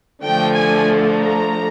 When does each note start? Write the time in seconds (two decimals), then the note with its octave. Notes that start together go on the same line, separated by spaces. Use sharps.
0.23 D3 F3 A3 G5
0.54 G#5
1.13 A#5